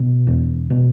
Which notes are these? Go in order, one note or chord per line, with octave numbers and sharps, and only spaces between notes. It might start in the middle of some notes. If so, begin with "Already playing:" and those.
Already playing: B2
E2
B2